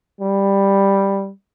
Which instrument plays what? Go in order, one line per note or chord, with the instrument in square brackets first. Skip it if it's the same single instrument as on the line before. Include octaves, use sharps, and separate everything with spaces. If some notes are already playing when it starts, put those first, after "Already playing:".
[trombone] G3